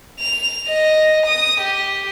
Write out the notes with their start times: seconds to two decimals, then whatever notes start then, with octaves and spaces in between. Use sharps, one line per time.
0.20 F7
0.69 D#5
1.27 D#6
1.61 G4